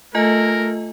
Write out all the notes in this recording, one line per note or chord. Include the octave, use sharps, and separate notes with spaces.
A3 F4 A#4 D#5 G#5